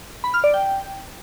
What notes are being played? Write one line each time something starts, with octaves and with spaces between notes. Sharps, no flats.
B5
F6
D5
G5